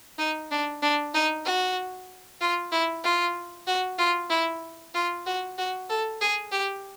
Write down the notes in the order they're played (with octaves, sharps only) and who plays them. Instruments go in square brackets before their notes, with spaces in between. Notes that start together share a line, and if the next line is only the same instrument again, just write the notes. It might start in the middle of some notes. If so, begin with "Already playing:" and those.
[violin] D#4
D4
D4
D#4
F#4
F4
E4
F4
F#4
F4
E4
F4
F#4
F#4
A4
G#4
G4